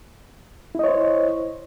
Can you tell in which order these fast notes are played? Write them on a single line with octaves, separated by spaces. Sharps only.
E4 D#5 C#5 C5